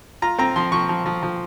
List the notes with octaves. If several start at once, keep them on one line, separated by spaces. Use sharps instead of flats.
F4 A#5
C4 A#5
F3 C6
F3 C#6
F3
F3
F3